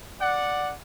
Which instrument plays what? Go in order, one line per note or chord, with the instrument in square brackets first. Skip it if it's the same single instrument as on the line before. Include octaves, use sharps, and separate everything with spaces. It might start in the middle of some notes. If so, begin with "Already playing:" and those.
[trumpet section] D5 F#5